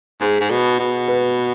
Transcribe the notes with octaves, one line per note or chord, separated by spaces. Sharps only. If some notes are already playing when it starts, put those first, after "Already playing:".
G#2 G#4
G#2
B2
B2
B4